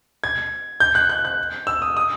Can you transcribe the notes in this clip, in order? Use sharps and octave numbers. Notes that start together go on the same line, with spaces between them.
G#6
G6
F#6
F#6
F#6
E6
D#6
D#6